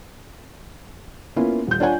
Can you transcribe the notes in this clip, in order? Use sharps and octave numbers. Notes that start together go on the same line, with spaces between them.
A#3 B3 C#4 E4 F4
D#1 G6
D4 F4 C#5 F#5 G#5